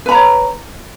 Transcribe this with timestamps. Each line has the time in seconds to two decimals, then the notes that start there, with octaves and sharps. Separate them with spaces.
0.06 B4
0.09 B5
0.12 A#5
0.14 C#5